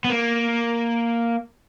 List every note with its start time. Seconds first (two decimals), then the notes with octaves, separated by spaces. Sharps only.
0.05 B3
0.10 A#3